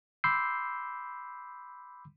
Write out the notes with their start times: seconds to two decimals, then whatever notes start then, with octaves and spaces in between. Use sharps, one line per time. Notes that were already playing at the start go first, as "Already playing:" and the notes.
0.24 B5 C6 D6 E6 G6 C7